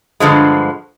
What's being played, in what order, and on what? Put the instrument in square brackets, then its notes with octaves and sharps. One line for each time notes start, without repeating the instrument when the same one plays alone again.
[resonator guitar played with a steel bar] G2 D3 F3 G#3